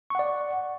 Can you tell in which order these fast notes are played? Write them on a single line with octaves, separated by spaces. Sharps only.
C#6 F#5 D5